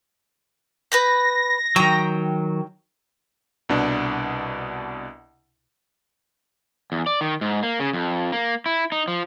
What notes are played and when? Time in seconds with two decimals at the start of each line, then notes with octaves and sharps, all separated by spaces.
0.92 B4 B5 G6 A#6
1.76 D#3 F#3 G5 A#5
3.69 C2 B2 D4
6.92 E2
7.06 D5
7.21 D#3
7.41 G#2
7.63 A#3
7.80 C#3
7.93 F2
8.32 A#3
8.66 E4
8.92 D#4
9.08 F3